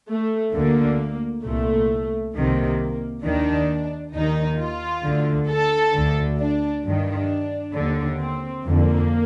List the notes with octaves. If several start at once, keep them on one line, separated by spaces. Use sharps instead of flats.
A3
D2 D3 A#3
C2 A#2 A3
C2 C3 D#3 A#3
D#2 D#3 D4
D#2 D#3 D#4
F4
D2 D3
A4
D2 D3
D4
G2 D#3 D4
D#2 D3
C4
F2 D3 A#3